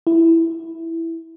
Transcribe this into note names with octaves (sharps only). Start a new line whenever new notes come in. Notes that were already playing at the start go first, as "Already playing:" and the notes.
E4